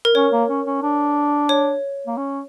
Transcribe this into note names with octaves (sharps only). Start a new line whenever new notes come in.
A#4
C#4 C#5
A#3
C#4
C#4
D4
C#5
A#3
C#4